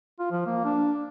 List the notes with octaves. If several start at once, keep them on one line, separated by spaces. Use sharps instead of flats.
F4
F3
A#3
D4